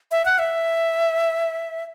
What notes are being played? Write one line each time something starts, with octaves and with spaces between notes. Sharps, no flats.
E5
F#5
E5